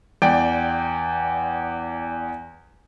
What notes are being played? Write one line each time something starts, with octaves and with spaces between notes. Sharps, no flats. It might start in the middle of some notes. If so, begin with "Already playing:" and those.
E2 D5 G5 D7